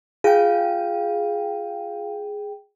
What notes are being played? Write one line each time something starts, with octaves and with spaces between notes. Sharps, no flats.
F4 G#4 F5 G5